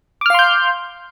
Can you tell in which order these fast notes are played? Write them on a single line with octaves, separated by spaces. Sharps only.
D6 F6 F5 C6 G6